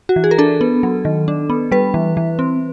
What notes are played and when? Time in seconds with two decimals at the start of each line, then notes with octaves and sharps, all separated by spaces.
0.09 F#4
0.16 E3
0.24 G#4
0.31 A#4
0.38 D4 A4
0.61 B3
0.83 F#3
1.05 D#3
1.28 D4
1.50 B3
1.72 G3 B4
1.94 E3
2.17 E3
2.39 C4